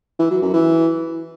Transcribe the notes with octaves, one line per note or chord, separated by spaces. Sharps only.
E3
F#3
F#2
E3